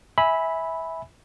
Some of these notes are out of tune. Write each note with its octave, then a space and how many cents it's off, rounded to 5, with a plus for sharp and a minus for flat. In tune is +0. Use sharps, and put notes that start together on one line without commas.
E5 -15 G#5 +0 B5 +0